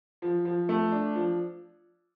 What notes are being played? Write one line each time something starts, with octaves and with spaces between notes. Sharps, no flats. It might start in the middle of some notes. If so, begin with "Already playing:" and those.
F3
F3
A3
D4
F3